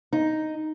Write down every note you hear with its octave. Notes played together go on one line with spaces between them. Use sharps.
D#4